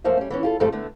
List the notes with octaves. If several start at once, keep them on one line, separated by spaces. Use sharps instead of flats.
F#2 F3 A3 A#3 C5 E5
G3 C#4
E3 B3 C#4
F4 G4 A4
F2 G#2 C#3 G3 A3 A4
D3 A3 B3